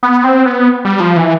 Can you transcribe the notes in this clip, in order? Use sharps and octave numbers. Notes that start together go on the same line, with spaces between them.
B3
C4
B3
G3
F3
E3